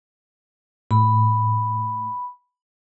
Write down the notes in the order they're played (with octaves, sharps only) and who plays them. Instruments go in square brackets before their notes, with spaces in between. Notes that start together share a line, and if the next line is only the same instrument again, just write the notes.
[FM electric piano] A2 [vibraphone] B5